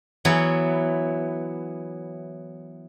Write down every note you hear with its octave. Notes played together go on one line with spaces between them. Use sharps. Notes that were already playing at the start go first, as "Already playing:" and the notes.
E3 F#3 B3